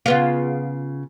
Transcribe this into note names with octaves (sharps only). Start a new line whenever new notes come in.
C#3 B3 F4